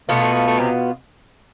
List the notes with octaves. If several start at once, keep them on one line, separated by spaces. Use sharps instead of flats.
B2 A3 B3 F4
A3
A3
A3
C3